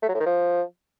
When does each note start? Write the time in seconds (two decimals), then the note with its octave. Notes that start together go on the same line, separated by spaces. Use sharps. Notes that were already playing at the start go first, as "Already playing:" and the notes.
0.03 A3
0.09 F#3
0.14 A2
0.20 D#3
0.26 F3